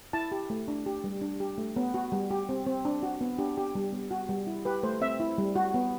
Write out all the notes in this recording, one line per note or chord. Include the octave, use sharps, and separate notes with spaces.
E4 A5
G4
A3
D4
G4
G3
D4
G4
A3
B3
F#4
G3
G4
C4
C4
D4
F#4
B3
D4 G4
G4
G3
B3
F#4
G3
E4
G4 B4
A3 C5
C4 E5
E4
G3
F#4
B3